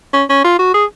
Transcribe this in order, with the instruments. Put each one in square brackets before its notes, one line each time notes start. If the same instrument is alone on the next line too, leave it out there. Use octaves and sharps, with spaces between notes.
[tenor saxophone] C#4
C#4
F4
F#4
G#4